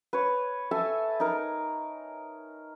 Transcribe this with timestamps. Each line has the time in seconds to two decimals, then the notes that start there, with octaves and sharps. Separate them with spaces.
0.13 B4 C#5
0.71 A4 E5 G#5 A5
1.20 D#4 A#4